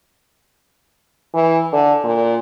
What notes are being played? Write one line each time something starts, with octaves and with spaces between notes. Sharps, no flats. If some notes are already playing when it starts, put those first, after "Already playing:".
E3
D3
A#2